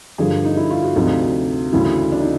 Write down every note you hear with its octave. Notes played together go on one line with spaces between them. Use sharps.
G2 D3 F3 G#4
D#4
E4
F4
F#4
D2 C3 F3 D#4
D2 C#3 E3 E4
D4
D#4